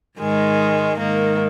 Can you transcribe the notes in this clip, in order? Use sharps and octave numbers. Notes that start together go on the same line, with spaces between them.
G#2 D#3 G#3
G#2 D#3 A#3